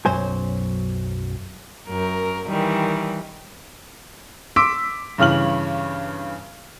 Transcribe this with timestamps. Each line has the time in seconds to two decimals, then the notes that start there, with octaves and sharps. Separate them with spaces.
0.06 B1 F#2 F#3 C5 G#5
1.89 F#2 A#4
2.49 D#3 E3 G3
4.56 C6 D6 E6 B6 D7
5.18 G2 C#3 E3 F6 F#7